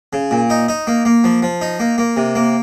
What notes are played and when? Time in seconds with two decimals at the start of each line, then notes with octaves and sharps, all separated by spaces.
0.13 C#3
0.31 A#2
0.50 D#4
0.68 D#4
0.87 A#3
1.05 A#3
1.24 F3
1.42 F3
1.61 D#4
1.80 A#3
1.98 A#3
2.17 C3
2.35 A#3